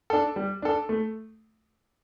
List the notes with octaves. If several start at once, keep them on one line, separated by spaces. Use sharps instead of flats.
D4 A4
G3
D4 A4
A3